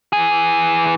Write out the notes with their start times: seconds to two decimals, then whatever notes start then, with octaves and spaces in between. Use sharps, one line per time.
0.13 E3 G#4